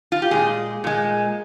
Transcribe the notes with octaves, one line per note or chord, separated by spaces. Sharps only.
F4
G4
A#2 G#3 G#4
A#2 G#3